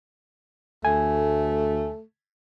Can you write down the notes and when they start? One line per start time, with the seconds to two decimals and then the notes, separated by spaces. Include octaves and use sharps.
0.85 D2 A3 G#5